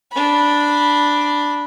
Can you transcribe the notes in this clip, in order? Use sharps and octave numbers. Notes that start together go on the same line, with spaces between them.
D4 B5